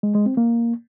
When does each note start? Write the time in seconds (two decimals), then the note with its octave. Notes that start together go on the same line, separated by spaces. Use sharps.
0.03 G#3
0.15 G#3
0.26 C4
0.37 A#3